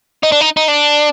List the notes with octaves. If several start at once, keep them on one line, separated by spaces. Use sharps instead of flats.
D#4
D4
D#4
D#4
D4